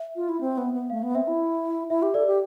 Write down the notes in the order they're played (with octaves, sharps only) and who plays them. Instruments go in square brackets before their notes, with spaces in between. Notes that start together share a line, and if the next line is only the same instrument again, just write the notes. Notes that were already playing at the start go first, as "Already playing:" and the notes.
Already playing: [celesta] E5
[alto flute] F4
E4
C4
B3
B3
[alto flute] A3 [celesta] F5
[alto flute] B3
[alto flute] C4 [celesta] E5
[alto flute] E4
[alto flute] E4 [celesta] E5
[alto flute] G4
[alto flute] A4 [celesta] D5
[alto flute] G4